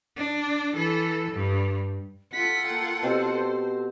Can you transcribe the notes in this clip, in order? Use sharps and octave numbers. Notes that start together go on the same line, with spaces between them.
D4
E3 A4
G2
F4 A4 F#5 B6
A#3 G5
B2 C4 G4 C5